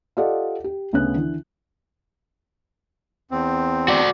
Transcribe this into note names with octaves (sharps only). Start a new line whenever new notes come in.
F4 G4 A4 D5 D#5 F#5
G4
D2 C#3 B3 C#4 F#6
D3 E3
E2 C4
F#4 D5